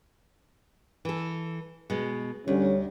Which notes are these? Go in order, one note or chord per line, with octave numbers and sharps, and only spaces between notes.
E3 A4
B2 G#3
D2 D3 G3 C#4